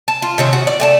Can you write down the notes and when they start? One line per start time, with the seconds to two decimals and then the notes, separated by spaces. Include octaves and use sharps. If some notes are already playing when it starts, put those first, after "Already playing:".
0.08 A5
0.22 F4
0.38 C3 D#3 C#4
0.53 F#4
0.67 D5
0.80 A3 G5 A5